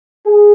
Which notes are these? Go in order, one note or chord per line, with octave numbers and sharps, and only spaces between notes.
G#4